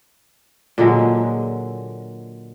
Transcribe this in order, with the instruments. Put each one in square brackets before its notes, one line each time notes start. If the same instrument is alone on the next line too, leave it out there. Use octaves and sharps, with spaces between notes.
[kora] A#2 D3 F#3 G#3